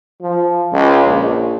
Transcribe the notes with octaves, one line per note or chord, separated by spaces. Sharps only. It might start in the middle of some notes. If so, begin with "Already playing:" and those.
F3
C#2
A#1